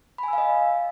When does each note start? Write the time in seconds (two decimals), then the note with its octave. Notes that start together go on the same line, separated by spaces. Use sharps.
0.18 B5
0.23 G#5
0.28 E6
0.33 F5
0.38 D#5